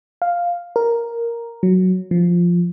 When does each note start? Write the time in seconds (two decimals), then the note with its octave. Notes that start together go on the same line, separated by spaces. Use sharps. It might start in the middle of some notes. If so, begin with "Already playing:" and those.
0.22 F5
0.76 A#4
1.63 F#3
2.11 F3